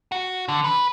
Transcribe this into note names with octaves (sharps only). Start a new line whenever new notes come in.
F#4
D3
B4